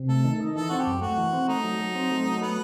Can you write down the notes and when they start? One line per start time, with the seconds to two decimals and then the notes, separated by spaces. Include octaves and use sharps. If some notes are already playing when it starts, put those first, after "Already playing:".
Already playing: C3
0.09 A3 A4
0.25 D#3
0.40 D#4
0.55 E3 A4
0.69 C4 F#4
0.79 G4
0.87 F#2
1.02 A3 F#4
1.17 E3
1.33 C4
1.48 A3 D#4
1.64 F#3
1.79 F#3
1.95 C4
2.11 A3
2.26 F#3
2.41 A3 B3